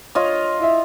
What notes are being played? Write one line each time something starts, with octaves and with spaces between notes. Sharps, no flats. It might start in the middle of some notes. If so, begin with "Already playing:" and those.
F4 C#5 D#5
E4 E5